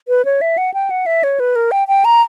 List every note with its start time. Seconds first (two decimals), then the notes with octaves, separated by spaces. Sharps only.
0.08 B4
0.25 C#5
0.41 E5
0.58 F#5
0.74 G5
0.90 F#5
1.06 E5
1.24 C#5
1.40 B4
1.56 A#4
1.71 G5
1.88 G5
2.05 A#5